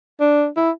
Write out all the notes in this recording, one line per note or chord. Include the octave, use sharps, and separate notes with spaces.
D4
E4